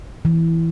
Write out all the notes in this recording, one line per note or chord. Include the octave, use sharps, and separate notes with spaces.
E3